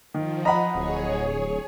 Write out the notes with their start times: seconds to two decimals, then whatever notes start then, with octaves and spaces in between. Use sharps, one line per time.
0.14 D#3 F3
0.45 D#5 F#5 A#5 B5
0.75 D1 G#4 C#5